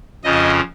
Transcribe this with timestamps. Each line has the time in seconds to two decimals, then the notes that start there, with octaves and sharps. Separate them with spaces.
0.24 F2 C#3 F3 D#5